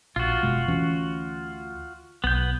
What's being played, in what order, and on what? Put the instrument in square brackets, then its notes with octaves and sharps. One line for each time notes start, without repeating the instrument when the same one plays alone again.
[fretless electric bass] A#1 [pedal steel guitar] F4 F#4
[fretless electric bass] F1 B2 G#3
D2 E3 C#4
[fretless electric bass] B1 [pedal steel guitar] B3 G6